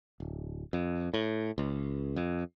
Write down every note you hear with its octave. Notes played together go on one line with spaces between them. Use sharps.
D1
F2
A2
C#2
F2